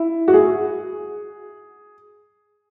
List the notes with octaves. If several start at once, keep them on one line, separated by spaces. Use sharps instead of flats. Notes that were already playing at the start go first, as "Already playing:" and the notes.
Already playing: E4
F#4
G#4